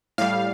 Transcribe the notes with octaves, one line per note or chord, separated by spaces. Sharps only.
A2 G3 F5